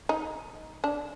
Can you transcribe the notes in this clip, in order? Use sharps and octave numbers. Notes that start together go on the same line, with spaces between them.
D#4
D4